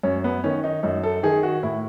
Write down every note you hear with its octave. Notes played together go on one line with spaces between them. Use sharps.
F#2 C#4
B3
D#3 C#4
D#4
F#2 D#4
A4
D#3 G#4
F#4
A2 E4